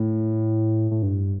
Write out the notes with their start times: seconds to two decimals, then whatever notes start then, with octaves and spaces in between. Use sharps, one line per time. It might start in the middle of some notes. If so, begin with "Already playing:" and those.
Already playing: A2
0.91 A2
1.03 G2